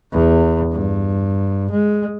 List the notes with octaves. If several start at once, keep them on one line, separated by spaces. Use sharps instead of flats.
E2
G2
G#3